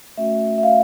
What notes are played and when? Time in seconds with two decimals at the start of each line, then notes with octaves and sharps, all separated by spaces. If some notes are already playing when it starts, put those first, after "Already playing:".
0.17 A3 C#4 F#4 E5
0.58 E5
0.63 F5